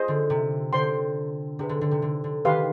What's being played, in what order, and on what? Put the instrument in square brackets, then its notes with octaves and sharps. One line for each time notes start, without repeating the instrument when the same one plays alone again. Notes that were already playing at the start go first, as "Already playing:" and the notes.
Already playing: [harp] F4 [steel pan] G#4 C5 D#5
[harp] D3
C3
[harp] D3 [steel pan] C5 G5 C6
[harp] C3 [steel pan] D4 G#4 B4
[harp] D3
D3
C3
D3
D3
[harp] D#3 [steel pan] G4 B4 F5 C6